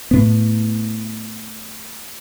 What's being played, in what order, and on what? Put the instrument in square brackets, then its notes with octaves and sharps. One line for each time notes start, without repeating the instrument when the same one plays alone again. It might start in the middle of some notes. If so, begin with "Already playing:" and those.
[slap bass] A2 B3